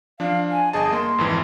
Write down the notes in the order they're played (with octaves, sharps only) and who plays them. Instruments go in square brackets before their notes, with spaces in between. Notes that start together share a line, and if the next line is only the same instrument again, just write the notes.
[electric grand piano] F3 D4 [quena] F5
[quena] G#5
[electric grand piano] G1 G#4 A5 [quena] D#5
[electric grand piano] A#3 [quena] C6
[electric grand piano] G#1 F2 E3